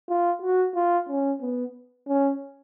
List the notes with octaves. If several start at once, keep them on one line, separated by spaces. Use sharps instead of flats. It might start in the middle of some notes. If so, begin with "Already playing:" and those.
F4
F#4
F4
C#4
B3
C#4